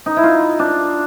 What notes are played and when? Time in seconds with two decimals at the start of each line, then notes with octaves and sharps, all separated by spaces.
0.06 D#4
0.16 E4
0.23 F4
0.59 D4